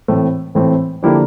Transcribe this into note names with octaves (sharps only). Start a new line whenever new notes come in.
A2 E3 A3 C4
A2 E3 A3 C4
D3 F3 A#3 D4 E4 G4